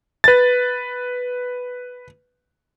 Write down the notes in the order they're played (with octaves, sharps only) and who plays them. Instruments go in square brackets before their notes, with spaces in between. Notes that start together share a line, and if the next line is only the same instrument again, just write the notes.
[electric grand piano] B4 A6